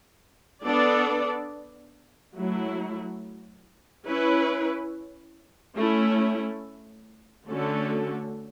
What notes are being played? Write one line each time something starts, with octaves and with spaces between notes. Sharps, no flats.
B3 D4 A4 D5
F#3 A3 E4
C#4 E4 B4
A3 C#4 E4
D3 A3 C#4 F#4 A4